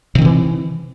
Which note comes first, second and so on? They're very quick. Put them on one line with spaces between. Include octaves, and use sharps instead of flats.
C3 D#3 C4 E3